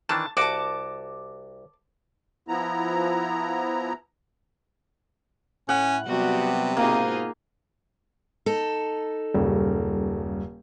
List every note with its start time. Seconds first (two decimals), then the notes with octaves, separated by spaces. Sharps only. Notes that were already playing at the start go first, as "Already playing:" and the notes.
0.09 D#3 E3 D4 A5
0.37 C2 F#4 A5 D6
2.48 F3 B3 E4 A#5
5.69 A2 C#4 F#5
6.07 C3 F#3 G3 B3 F#4 G4
6.77 G#2 B2 A#3 C4 D#4 F4 G#4
8.46 D#4 A4
9.34 D#1 F#2 C#3 G3